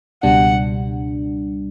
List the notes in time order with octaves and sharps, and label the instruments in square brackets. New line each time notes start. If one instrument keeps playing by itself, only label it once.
[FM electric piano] C#2 B2 G3 D4 [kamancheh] F#5